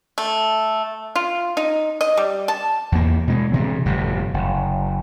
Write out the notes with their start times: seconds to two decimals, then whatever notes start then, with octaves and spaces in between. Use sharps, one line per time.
0.18 A3
1.16 F4
1.57 D#4
2.01 D#5
2.17 G3
2.48 A5
2.92 E2 A#3
3.27 B2 G#3
3.52 G2 C3 E3
3.86 G1 F2 A2 C3
4.34 F#1